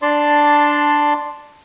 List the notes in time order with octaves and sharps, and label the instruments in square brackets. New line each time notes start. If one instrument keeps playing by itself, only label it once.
[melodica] D4 D5 A5 C6